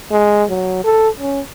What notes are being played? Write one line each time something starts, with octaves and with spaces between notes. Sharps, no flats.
G#3
F#3
A4
C#4